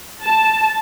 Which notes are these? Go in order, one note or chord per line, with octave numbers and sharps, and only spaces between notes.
A5